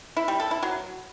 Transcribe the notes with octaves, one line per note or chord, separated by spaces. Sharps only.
E4
G3
A4
E4
F#3